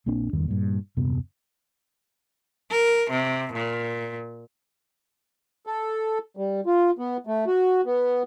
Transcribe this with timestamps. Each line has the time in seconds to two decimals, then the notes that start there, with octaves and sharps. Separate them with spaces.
0.06 A#1 A#3 C4 D4
0.33 F#1 E2 G2 D#3
0.48 G2 A#2
0.97 D#1 F#2 C3 B3
2.71 A#4
3.10 C3
3.53 A#2
5.67 A4
6.37 G3
6.66 F4
6.99 B3
7.27 A3
7.47 F#4
7.85 B3